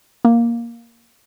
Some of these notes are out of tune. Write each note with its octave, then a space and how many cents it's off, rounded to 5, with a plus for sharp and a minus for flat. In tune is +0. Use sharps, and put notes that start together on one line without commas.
A#3 +5